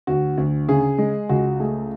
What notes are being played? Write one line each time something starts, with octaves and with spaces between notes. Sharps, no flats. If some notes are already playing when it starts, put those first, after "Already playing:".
D2 F#4
D2
C#3 G#4
G#3
C#2 F#4
A3 G#4